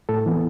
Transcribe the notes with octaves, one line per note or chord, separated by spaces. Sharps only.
A2 A4
E3 B3